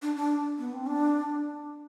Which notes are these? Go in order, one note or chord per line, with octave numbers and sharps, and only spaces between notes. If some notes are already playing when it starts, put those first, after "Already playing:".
D4
D4
B3
C4
D4